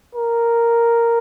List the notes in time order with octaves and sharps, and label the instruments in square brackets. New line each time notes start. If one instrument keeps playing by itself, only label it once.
[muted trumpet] A#4